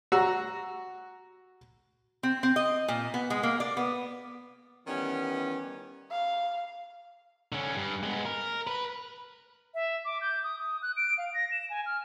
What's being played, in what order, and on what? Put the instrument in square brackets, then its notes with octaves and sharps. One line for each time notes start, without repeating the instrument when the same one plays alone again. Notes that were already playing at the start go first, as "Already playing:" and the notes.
[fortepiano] F#4 A#5 E6
[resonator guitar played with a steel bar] C4
C4
D#5
A#2
B3
G#3
A#3
D5
B3
[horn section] D#3 E3 G3 B3 C#4
[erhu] F5
[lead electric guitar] D3 C#4
G2
G#3 B3
A#4
B4
[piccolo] E5
D6
G6
D#6
D#6
F#6
D7
F5
A#6
E7
G#5
F6